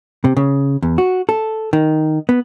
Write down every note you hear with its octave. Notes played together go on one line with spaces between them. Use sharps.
C3
C#3
E2
F#4
A4
D#3
B3